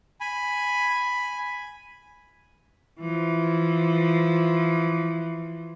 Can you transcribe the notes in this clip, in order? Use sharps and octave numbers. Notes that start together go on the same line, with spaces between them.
G#5 B5
E3 F3